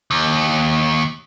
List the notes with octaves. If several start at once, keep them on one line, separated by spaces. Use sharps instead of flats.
D#2